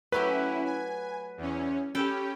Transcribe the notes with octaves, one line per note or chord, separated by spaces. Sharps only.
F#3 A3 C#4 E4 G4 B4
G#5
E2 C#4
C#4 G4 A4 B4 G5